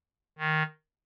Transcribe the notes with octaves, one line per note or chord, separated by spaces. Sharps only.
D#3